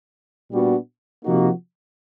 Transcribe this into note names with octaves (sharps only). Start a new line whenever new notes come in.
A#2 G3 B3 D4 F#4
C3 F3 A#3 D#4 F#4